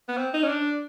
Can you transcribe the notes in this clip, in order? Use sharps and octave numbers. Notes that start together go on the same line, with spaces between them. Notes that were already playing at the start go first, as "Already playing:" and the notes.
B3
C4
D#4
C#4
D4